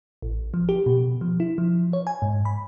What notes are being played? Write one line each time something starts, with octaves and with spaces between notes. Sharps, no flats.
A1
F3
G4
B2
F3
E4
F3
C#5
G#5
G#2
B5